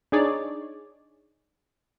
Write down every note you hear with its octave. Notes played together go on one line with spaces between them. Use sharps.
D4 D#4 G#4 C#5 D5